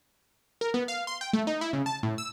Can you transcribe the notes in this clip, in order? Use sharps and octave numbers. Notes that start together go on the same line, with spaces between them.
A#4
B3
F5
C6
G5
A3
D#4
E4
C#3
A5
A2
E6